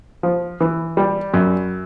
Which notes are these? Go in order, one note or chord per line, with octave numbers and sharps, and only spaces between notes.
F3
E3
G3
F#2